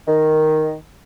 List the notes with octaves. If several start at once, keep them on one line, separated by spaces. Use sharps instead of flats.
D#3